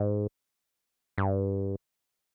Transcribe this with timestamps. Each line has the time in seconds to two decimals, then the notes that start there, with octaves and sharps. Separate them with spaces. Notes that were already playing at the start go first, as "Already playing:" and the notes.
Already playing: G#2
1.18 G2